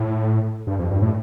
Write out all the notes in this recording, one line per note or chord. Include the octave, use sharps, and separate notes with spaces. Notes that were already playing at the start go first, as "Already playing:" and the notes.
Already playing: A2
G2
F2
G2
A2